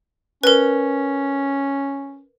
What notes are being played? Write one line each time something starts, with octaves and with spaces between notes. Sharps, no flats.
C#4 A#4 B4